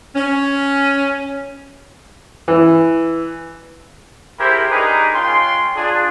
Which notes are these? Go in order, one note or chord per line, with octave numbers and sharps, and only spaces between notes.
C#4
E3
E4 G4 G#4 A#4 C5
D4 D#4 G4 G#4 A#4 B4
G#3 C#4 F4 G5 C6
D4 F4 G#4